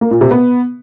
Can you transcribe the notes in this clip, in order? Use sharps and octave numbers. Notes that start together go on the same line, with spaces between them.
A#3
A#2
C3
B3